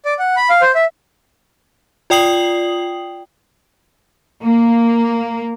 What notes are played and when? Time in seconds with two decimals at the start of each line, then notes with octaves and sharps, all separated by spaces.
0.05 D5
0.19 F#5
0.36 B5
0.50 F5
0.62 C5
0.75 E5
2.10 F4 D5 G5 D#6 C7 F#7
4.43 A#3